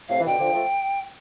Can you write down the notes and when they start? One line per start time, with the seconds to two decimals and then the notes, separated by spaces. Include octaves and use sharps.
0.09 A2 C3 F5
0.20 E3
0.26 B2 D3 G5
0.39 D3 F3
0.53 F3 A3